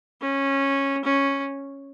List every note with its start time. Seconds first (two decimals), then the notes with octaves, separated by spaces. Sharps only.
0.22 C#4
1.04 C#4